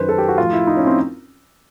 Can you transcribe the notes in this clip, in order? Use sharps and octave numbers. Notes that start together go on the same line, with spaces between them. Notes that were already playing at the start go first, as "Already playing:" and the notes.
Already playing: F#2 D#3 B4 C5
A4
G4
F#4
A2 F3 F4
E4
D#4
C#4
C4